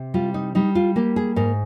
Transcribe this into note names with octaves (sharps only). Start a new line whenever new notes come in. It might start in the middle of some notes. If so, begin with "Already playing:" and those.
Already playing: C3
G3 F4
D#4
G3 D#4
F4
A#3 G4
G#4
G#2 A#4